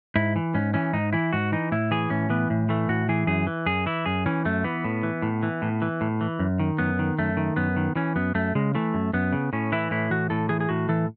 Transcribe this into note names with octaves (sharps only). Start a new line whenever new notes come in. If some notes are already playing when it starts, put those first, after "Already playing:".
G#2 E4
E3
G#2 C#4
E3 C#4
G#2 D#4
E3 E4
G#2 F#4
E3 D#4
A2 E4
E3 G#4
A2 C#4
E3 B3
A2
E3 A3
A2 F#4
E3 G#4
F#2 G#4
E3
F#2 G#4
E3 E4
F#2 G#4
E3 C#4
F#2 A3
E3 B3
A2
E3
A2
E3
A2
E3
A2
E3
F#2
D#3
F#2 B3
D#3
F#2 A3
D#3
F#2 B3
D#3
E3 C#4
F#2 B3
F#2 A3
C#3 G#3
E3 A3
F#2
F#2 B3
C#3
A2 C#4
E3 E4
A2 E4
E3 F#4
A2 A4
E3 G#4
G#4
A2 F#4
E3 A4